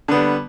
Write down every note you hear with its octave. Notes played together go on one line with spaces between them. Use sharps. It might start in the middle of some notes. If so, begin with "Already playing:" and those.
D3 G3 B3